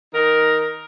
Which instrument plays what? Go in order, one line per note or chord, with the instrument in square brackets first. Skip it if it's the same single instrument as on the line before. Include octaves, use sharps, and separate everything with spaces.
[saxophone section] D#3 D#4 A#4